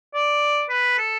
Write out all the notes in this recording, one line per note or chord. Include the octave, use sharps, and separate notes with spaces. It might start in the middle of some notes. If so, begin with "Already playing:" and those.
D5
B4
A4